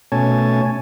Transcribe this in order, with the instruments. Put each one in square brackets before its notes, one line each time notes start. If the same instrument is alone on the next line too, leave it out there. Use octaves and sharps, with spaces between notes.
[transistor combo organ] B2 A3 C#4 C#5 G#5 A5